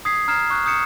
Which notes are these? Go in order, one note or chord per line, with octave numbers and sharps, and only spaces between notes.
D#6 G#6 B6 C7
A#5 F6 G#6 C7 E7
C#6 F#6
D#6 G6 C#7 E7